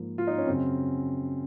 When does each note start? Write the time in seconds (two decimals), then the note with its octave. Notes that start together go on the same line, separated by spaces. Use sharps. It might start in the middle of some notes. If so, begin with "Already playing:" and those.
Already playing: G#2 F3 A#3
0.18 F4
0.27 D#4
0.38 C#4
0.47 F#2 C#3 F#3 C4